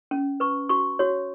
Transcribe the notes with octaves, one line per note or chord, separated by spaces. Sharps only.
C#4
B4 C#6
F#4 C#6
F#4 C#5